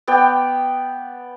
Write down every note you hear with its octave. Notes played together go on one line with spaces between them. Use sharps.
B3 D5 G5